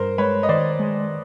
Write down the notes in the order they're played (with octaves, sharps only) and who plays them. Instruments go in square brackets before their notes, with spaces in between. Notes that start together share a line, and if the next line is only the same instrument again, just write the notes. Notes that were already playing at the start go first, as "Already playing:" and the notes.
Already playing: [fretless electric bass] G2 [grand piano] A#4 C5
[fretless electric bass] G#3 [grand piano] B4 C#5
[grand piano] D#5
[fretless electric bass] D#3 [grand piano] C5 D5
[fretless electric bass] G#3